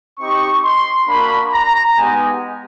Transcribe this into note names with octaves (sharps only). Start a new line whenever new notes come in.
C4 D#4 G4 C#6
C6
A#3 D4 F#4 B5
A#5
G#3 B3 D#4 G4 G#5